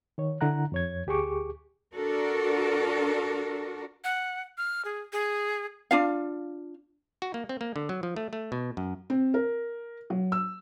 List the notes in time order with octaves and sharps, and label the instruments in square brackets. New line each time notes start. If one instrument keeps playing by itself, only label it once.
[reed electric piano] D#3 C#5
D3 E4 F#5 A#5 F#6
F2 C#5 G#6
D2 G4 G#4 C#6 D6
[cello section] D4 F#4 A4 A#4
[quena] F#5
F6
G#4
G#4
[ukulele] D4 F4 F5
[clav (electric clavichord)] F#4
A#3
C4
A#3
D3
F#3
F3
A3
A3
B2
F#2
[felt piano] C4
A#4
F#3
E6